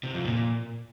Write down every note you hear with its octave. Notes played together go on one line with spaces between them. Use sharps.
C3
F2
A#2